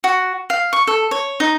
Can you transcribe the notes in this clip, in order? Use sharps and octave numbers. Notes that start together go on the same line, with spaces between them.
F#4
F5
C#6
A4
C#5
D#4